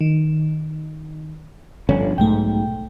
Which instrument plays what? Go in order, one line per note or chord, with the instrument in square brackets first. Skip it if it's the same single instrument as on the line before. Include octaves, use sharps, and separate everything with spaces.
[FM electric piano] D#3
[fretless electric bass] G1 D3 C#4 [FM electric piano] F3
[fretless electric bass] B1 G#2 [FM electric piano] A3 G5